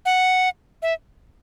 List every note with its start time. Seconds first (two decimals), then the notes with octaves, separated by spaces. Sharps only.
0.06 F#5
0.83 E5